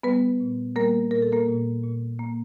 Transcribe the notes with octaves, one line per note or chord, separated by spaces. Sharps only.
G3 B3 B4
A#2
G3 A#3 A#4
A#2 A#4
A4
A#3 A#4
A#2
A#2
A#3